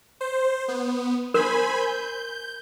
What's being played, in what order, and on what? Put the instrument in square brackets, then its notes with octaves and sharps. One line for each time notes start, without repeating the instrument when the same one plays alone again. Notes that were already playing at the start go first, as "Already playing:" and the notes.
[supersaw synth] C5
B3
[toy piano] A#4 [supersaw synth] C5 G#5 B5
[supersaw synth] G6